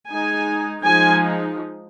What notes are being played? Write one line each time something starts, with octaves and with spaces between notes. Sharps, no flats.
G#3 D#4 G#5
F3 G#3 D#4 G#5